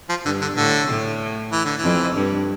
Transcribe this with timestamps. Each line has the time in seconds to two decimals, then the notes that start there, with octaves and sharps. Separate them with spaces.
0.09 F3
0.25 G2 D3
0.41 D3
0.56 A2 D3
0.88 A2
1.52 E3
1.65 D3
1.78 E3
1.83 F2
2.15 G2